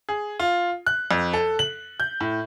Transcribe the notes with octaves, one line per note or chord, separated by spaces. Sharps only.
G#4
F4
F#6
F2
A4
F#7
G6
A2